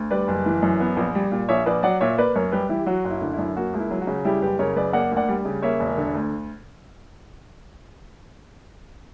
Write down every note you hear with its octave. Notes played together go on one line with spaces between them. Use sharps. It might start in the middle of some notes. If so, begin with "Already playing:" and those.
Already playing: D2
G3 B4 D5
F#1
E3
F#2
B3
A#1
G3
A#2
A#1 C#5 E5
A#1 B4 D5
F#3 D5 F#5
A#2 C#5 E5
A#3 B4 D5
F#2 A#4 C#5
G3 G4 B4
E3 E4 G4
F#3 F#4
F#1
E4
D3
E4
F#2
A#3 F#4
C#2
E4
F#3
F#4
C#3
G3 E4 G4
F#1 G4 B4
C#3 A#4 C#5
F#2 B4 D5
A#3 D5 F#5
D2
D5 F#5
G3
C#3
A#3 C#5 E5
E1
D3
D2